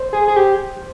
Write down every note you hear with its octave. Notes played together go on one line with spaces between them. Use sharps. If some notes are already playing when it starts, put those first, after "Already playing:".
Already playing: C5
G#4
G#4
G4